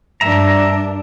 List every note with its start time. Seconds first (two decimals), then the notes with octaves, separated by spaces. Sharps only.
0.21 G2 D4 A#4 E5 A#5